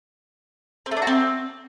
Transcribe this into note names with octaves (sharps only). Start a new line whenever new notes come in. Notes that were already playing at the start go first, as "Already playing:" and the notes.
C4
A3
D4
F#4
C4